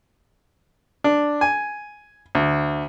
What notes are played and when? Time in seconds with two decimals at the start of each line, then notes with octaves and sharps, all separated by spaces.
1.04 D4
1.41 G#5
2.35 D2